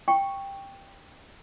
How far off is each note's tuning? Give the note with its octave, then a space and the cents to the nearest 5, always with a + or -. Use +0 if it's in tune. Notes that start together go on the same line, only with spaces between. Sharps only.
G5 +10 C#6 +0